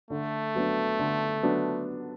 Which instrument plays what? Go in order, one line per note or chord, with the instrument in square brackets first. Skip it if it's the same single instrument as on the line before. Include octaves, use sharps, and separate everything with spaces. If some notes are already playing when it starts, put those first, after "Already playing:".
[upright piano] D3 [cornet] A3
[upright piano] F#3 B3 D4
D3
F#3 B3 D4